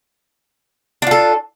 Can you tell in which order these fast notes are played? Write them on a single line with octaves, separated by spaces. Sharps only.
D4 F4 A4